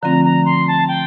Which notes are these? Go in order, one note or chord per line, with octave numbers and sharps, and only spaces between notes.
D3 F3 A3 C4 F4 A#5
A#5
C6
A5
G5